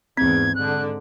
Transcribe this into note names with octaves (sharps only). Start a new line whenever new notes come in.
E2 G#2 C4 G#6
G#2 D3 F#6